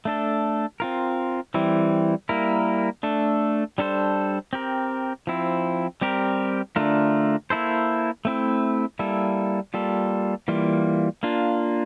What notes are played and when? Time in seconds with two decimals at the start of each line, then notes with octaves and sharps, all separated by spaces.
0.05 A3 D4 A4
0.80 C4 F4 A#4
1.54 E3 G3 C4 E4
2.29 G3 A#3 E4 A#4
3.03 A3 D4 A4
3.78 G3 D4 A4 C5
4.53 C4 G4 A#4
5.27 F3 C4 E4
6.01 G3 C4 G4 A#4
6.76 D3 A3 D4 F4 A#4
7.50 A#3 E4 A4 C5
8.25 A3 C4 E4
8.99 G3 A#3 E4 A4
9.74 G3 A#3 F4 A4
10.48 E3 G3 A#3 F4
11.23 A#3 D4 F4